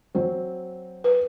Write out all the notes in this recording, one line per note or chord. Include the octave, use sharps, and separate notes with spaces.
F#3 C4
B4